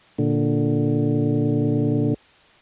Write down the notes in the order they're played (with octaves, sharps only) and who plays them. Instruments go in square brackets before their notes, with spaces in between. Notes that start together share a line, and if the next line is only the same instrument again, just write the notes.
[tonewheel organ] A#2 D3